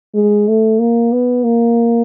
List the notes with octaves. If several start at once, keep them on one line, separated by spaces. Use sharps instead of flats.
G#3
A3
A#3
B3
A#3